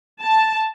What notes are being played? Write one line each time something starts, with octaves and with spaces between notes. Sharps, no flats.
A5